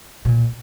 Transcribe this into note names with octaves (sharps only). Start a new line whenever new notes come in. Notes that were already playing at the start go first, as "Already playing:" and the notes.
B2
A#2